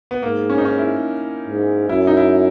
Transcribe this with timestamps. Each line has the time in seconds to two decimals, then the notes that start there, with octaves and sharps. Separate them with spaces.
0.11 B3
0.22 G#2 A#3
0.50 C#4
0.58 D#4
0.65 C#4
0.78 E4
1.47 G#2
1.89 F#2 E4
2.07 D#4
2.17 E4